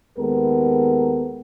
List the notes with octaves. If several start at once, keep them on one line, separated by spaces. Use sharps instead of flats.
D#2 G#3 B3 G4 A4 A#4